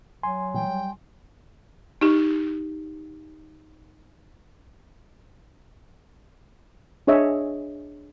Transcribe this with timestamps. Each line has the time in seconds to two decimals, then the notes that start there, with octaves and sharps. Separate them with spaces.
0.23 F#3 G#5 C6
0.54 A#2 E3 G3 G5
0.68 G3
2.01 D#4 G4
7.07 D4 G#4 C#5 D#5 E5